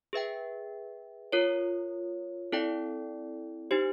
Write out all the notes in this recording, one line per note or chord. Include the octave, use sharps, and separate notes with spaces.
G#4 B4 E5 G5
F4 A#4 C#5
C4 E4 A4 D5 G5
D#4 G4 C5